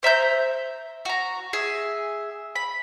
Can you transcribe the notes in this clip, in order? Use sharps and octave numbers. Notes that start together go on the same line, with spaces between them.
C5 E5 A#5 G6
F#4 A#5
G#4 E5
B5